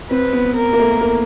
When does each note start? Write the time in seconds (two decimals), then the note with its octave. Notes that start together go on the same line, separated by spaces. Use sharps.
0.11 C4 B4
0.33 B3
0.56 A#4
0.73 A#3
0.79 A3
1.01 A#3